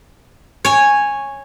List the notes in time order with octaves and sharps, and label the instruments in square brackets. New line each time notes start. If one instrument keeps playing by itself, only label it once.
[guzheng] C#5 G#5